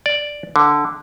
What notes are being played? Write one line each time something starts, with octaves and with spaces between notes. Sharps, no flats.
D5
D3